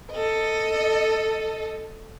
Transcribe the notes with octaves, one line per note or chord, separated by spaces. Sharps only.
A4 D#5